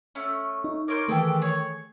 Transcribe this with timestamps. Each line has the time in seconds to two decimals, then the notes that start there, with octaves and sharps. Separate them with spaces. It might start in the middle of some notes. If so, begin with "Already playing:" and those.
0.15 A3 C#4
0.64 D#4
0.88 A#4 C#5 C6 D6 G6
1.09 D#3 E3 A3 G#4 A4 G5
1.42 G#4 C#5